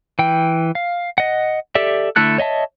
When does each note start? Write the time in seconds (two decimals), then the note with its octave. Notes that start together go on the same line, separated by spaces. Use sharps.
0.19 E3 G5
0.75 F5
1.18 D#5 F#5
1.75 G4 A4 D5 E5
2.16 D3 A3 E4 A4 F#6
2.38 C#5 D#5 E5 A5